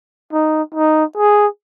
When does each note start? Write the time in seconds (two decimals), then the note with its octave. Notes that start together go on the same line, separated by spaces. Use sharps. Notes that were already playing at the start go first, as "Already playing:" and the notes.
0.33 D#4
0.74 D#4
1.17 G#4